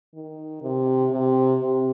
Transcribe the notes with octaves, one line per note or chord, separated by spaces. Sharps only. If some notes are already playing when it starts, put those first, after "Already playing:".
D#3
C3
C3
C3